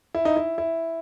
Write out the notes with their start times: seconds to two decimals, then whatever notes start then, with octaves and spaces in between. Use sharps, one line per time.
0.14 E4
0.25 D#4
0.36 E4
0.58 E4